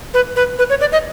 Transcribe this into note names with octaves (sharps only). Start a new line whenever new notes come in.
B4
B4
B4
C#5
D5
D#5